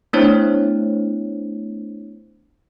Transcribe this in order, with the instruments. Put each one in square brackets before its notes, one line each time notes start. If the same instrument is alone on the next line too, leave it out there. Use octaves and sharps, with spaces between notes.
[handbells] A3 B3 D4 E4 C5 C#5